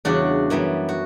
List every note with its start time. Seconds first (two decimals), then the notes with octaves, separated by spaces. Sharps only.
0.05 E2 C#3 G3 D4 F#4
0.50 F#2 E3 G3 B3
0.89 F#4